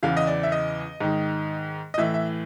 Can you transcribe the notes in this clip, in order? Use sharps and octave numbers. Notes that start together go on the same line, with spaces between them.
E2 C#3 E3 F5
D#5
D5
E5
D#5
G#2 D#3
D#5
A2 E3 E5
E5